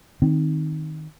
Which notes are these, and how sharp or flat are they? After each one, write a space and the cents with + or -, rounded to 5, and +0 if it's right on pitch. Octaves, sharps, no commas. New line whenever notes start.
D#3 +0 C4 +0